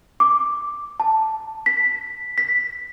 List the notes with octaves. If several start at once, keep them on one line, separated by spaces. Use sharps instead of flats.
D6
A5
B6
B6